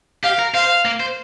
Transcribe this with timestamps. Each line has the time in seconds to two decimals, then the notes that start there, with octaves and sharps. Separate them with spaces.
0.24 G4 F5
0.39 A#4
0.54 C5 F5
0.85 A#3
1.00 C5